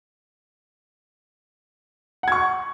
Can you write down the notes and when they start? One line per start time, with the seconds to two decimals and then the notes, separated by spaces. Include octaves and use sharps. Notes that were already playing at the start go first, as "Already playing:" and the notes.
2.23 F#5
2.28 G#6
2.32 C#6